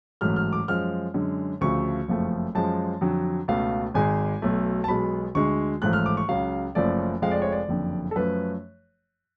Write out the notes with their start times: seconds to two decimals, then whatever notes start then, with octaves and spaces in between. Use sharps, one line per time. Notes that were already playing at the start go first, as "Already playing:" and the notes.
0.21 A1 G#2 F#3 A3 F6
0.36 F6
0.53 D6
0.68 F#2 F3 G#3 F6
1.14 F#2 D3 G#3
1.61 D2 C#3 F3 A3 C#6
2.09 F#1 F2 F3 A3
2.55 F#2 F3 G#3 A5
3.01 F2 D3 F#3
3.48 C#2 B2 A3 F5
3.94 G#1 G#2 G#3 G#5
4.42 B1 B2 A3
4.84 A5
4.88 B1 B2 G#3 B5
5.35 D2 D3 G#3 C#6
5.82 A1 G#2 F3 A3 F#6
5.93 F6
6.06 D6
6.17 C#6
6.28 C#2 C#3 F#3 F5
6.75 F#1 F#2 F3 A3 D5
7.22 F1 F2 F3 G#3 F5
7.31 D5
7.42 C#5
7.52 D5
7.68 F#1 F2 D3
8.11 A4
8.16 F#2 F3 A3 B4